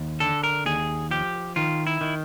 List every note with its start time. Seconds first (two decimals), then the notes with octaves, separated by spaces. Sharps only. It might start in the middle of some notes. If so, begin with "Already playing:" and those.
Already playing: D#2
0.20 D3 A4
0.44 A#4
0.66 D#2 G#4
1.11 F3 G4
1.56 D#3 F4
1.87 E4
2.01 D#3